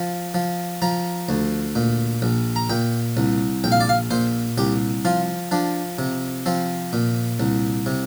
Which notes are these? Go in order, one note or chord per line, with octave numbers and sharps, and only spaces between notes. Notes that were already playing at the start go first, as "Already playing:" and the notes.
Already playing: F3
F3
F3 A#5
D2
A#2
A#1
A#5
A#2 G5
C2
A#1 G5
F5
D5
F5
A#2 C5
C2 G4
F3 F4
F3 D4
C3
F3 C4
A#2
C2
C3